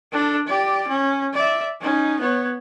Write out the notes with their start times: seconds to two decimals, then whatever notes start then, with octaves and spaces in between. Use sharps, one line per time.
0.12 D4 A4
0.47 G4 D5
0.88 C#4
1.34 D5 E5
1.81 C#4 D#4
2.20 B3 C#5